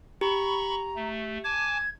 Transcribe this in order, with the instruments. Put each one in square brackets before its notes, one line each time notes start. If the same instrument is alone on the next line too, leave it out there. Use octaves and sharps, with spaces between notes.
[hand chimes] G4 [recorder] A#5 [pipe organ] B5 C#6
[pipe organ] A3
[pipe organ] G#5 A5 D6 [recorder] G#6